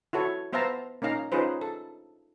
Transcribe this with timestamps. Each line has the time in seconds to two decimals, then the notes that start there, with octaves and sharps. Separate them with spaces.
0.13 E4 F#4 A4 C#5
0.53 B3 C5 E5 F5 A5 A#5
1.02 A#3 C#4 D#4 F5 A#5
1.32 C#4 D#4 F4 G#4 B4 C5
1.61 A4